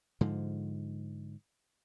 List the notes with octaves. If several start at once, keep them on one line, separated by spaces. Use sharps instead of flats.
G#2 D3 F3